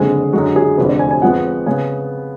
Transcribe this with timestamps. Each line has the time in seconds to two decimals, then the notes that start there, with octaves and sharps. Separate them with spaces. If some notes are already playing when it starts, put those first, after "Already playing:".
Already playing: F#1 F2 D3 G#3 G#4
0.33 F#2 D3 G#3 F#4
0.56 G#4
0.77 F1 F2 D3 B4
0.89 D5
0.99 G#5
1.11 G#5
1.22 F2 F3 G#3 B3 F#5
1.66 C#3 G#3 B3 G#5